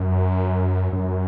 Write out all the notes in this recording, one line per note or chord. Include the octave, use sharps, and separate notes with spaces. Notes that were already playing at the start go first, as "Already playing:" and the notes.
Already playing: F#2
F#2